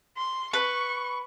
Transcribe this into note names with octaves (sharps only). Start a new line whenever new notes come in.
C6
B4 C#6